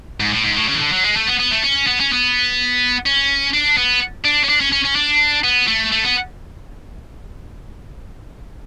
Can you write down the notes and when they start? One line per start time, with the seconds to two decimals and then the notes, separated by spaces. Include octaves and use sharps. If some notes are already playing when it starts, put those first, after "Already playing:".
0.20 G#2
0.32 A2
0.44 G#2
0.56 A2
0.68 C#3
0.74 E3
0.80 D3
0.92 F#3
1.04 G#3
1.16 A3
1.27 B3
1.39 B3
1.51 A3
1.63 C#4
1.87 B3
2.00 C#4
2.13 B3
3.06 C#4
3.53 D4
3.77 B3
4.24 D4
4.44 C#4
4.49 D4
4.61 C#4
4.72 C#4
4.85 C#4
4.96 D4
5.44 B3
5.67 A3
5.92 A3
6.04 B3